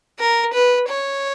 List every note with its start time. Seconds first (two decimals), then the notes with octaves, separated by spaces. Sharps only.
0.19 A#4
0.54 B4
0.89 C#5